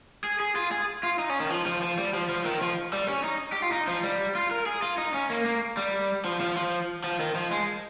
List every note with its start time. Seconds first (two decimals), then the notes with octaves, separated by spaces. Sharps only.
0.24 G#4
0.40 G#4
0.55 F4
0.71 G#4
1.03 F4
1.19 D#4
1.30 C#4
1.40 D#3
1.50 F3
1.66 F3
1.82 F3
1.98 G3
2.14 F3
2.29 F3
2.45 D#3
2.61 F3
2.93 G3
3.08 C#4
3.24 D#4
3.52 G4
3.62 F4
3.72 D#4
3.88 F3
4.03 G3
4.35 F4
4.51 A#4
4.66 G#4
4.82 F4
4.98 D#4
5.14 C#4
5.30 A#3
5.46 A#3
5.77 G3
6.25 F3
6.41 F3
6.56 F3
7.04 F3
7.20 D#3
7.35 F3
7.51 G#3